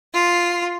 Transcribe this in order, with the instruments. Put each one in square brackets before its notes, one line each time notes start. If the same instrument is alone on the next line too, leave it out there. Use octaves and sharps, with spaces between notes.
[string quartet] F4